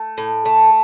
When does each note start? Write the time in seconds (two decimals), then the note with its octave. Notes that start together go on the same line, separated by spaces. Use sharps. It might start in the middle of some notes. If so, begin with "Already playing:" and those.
Already playing: A3
0.18 A2
0.45 A3